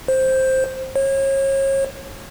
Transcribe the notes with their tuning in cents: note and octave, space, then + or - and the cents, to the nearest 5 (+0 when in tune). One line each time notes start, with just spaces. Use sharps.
C5 +5
C#5 -35